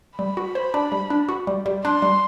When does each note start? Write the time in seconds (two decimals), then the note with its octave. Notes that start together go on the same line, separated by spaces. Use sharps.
0.18 G3 B5
0.37 F#4
0.55 C5
0.74 D4
0.92 G3
1.10 D4
1.29 F#4
1.47 G3
1.66 G3
1.84 D4 C6
2.02 G3